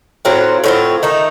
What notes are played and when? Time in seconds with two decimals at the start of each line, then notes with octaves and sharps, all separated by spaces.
0.25 A2 F#3 C4 F4
0.64 A2 F#3 C4 F4
1.03 D#3 A3 D#4